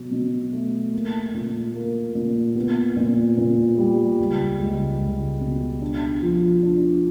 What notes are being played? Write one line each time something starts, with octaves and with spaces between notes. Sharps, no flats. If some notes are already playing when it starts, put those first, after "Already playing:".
Already playing: B2 F#3
B2
A3
A#3
A#2
A#3
A#2
B3
A#2
A#2
G3
C#2
C#2
C#2
B2
D4
F3
D4